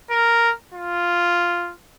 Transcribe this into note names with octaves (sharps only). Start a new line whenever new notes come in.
A#4
F4